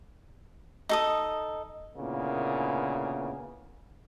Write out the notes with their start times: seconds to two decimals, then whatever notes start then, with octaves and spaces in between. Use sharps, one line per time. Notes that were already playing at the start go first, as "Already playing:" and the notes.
0.89 D#4 A4 D#6
1.97 D2 A#2 C#3 A#3 B3 E4